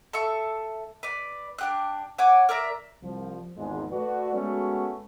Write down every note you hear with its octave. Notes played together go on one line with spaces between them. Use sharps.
A4 E5 C#6
B4 D5
D4 G4 F#6
C#5 F#5 G#5 D6
A#4 D5 E5 A#5
C2 F3
G#1 E2 G#2 F3 G#3
A3 F#4 B4 D5
G#3 A3 B3 C#4 F#4